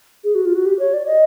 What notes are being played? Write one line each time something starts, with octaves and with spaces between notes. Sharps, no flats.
G#4
F#4
F4
F#4
G4
C#5
D5
D#5